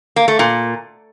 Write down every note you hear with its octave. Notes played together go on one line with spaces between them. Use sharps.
A#3
A3
A#2